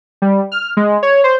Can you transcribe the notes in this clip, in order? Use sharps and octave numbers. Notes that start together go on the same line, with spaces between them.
G3
F6
G#3
C#5
C5